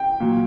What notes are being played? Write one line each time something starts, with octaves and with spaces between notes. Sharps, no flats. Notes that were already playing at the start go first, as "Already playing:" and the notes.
Already playing: G5
A#2 F#3